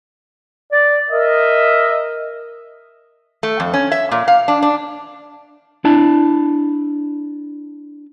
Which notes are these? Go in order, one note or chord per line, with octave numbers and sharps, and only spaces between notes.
D5
A#4 D#5 E5
A3
F2
C#4
E5
A#2
F5
D4
D4
D4 E4 A5